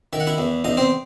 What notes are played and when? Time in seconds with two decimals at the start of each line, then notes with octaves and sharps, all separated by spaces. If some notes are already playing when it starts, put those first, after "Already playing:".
0.13 D#3 E5
0.20 F#5
0.27 E4 E5
0.38 E2
0.64 E2 D#4 D#5
0.77 C4 C5